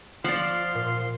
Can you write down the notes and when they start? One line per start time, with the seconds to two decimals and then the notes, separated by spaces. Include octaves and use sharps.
0.24 F3 D5 F#5 C6 F6
0.75 A#2